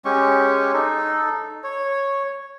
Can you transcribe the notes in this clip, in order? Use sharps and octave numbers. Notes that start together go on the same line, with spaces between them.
G#3 C#4 G4 C#6
D#4 A4
C#5